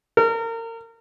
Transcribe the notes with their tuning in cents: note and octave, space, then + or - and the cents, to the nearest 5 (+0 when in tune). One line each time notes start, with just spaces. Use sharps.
A#4 -30